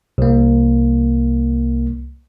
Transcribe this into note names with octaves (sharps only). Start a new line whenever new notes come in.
C2 A#3